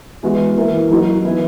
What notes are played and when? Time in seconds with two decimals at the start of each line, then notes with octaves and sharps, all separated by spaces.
0.23 E3 G#3 B3 F#4
0.57 E3 A#3 E4
0.90 F#3 A#3 D#4 F#4
1.24 E3 B3 E4